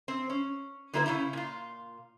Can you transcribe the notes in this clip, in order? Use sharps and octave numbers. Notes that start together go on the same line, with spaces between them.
C4
C#4
D3 F#3 A#3 E4 A4 B4
C#3 F3 C#4 E4
A#2 F4